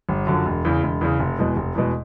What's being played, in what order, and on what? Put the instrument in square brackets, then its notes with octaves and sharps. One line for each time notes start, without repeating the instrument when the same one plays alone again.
[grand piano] G1
F#2 D3 F3
E1
E2 C#3
E1
E2 C#3
F1
E2 B2 G#3
F1
E2 B2 G#3